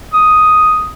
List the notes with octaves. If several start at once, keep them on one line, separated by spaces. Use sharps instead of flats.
D#6